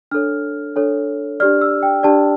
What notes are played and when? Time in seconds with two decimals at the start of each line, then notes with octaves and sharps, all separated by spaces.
0.11 D4 A4 C#5 F6
0.76 D4 A4 C#5
1.40 D4 G4 D5 F6
1.61 E6
1.83 G5
2.03 D4 G4 D5 A5